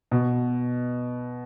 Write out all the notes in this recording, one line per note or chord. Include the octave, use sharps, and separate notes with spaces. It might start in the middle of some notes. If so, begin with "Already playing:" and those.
B2